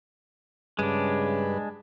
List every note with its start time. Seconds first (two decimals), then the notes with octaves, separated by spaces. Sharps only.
0.79 G2 C#3 G#3 D4 B4